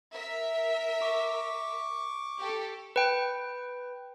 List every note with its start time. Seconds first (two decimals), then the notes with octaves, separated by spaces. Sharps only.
0.12 A#4 E5
1.01 C#6 D6
2.39 G4 A4
2.96 B4 G5